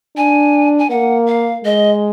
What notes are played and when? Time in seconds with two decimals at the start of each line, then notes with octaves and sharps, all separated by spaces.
0.17 D4 G#5
0.79 G#5
0.90 A#3 F#5
1.27 F5
1.65 G#3 D#5